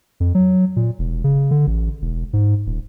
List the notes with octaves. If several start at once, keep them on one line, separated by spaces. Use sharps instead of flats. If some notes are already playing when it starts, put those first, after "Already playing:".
F2
F#3
A#2
E1
C#3
D3
A1
E1
G#2
D#1